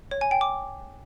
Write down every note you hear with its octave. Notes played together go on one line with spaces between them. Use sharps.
C#5
G#5
G5
D6